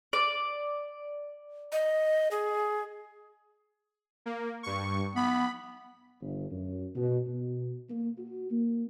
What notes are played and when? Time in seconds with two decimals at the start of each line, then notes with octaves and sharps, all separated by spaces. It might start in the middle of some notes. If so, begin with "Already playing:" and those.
0.13 D5
1.72 D#5
2.31 G#4
4.26 A#3
4.63 G2 C#6
5.16 B3 B5
6.20 G1
6.50 F#2
6.94 B2
7.27 B2
7.89 A#3
8.18 F#4
8.51 A#3